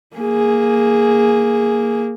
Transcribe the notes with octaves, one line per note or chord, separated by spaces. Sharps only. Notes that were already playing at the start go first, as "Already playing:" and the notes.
A#3 G#4